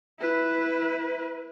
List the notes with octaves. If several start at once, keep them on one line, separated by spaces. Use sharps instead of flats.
E4 B4